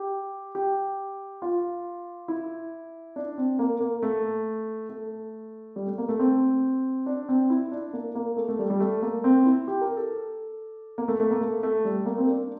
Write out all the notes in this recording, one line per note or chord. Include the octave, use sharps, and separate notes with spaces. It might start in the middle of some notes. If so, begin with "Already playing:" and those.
Already playing: G4
G4
F4
E4
D4
C4
A#3
A#3
A3
A3
G3
A3
A#3
A3
C4
D4
C4
E4
D4
A#3
A#3
A3
A3
G3
G3
A3
A#3
C4
E4
G4
A#4
A4
A#3
A3
A3
A#3
A3
A3
G3
A#3
C4
D4